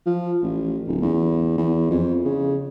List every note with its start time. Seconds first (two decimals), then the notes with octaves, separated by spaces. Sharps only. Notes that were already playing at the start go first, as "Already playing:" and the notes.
0.06 F3
0.42 A1
0.87 D1
1.02 E2
1.58 E2
1.91 F2
2.25 C#3